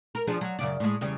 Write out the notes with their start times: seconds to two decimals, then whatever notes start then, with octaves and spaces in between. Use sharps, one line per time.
0.15 A#4
0.27 F3 D4 G#4
0.41 F#3
0.59 F#2 C#3 D5
0.80 A2 G#3
1.01 E2 C#3 G3